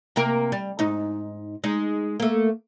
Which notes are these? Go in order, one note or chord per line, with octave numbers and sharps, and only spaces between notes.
C3 A#3 A#4
G3
G#2 D#4
G#3 D#4
A3 A#3